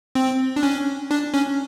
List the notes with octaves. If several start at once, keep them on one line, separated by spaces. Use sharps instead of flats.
C4
D4
C#4
D4
C#4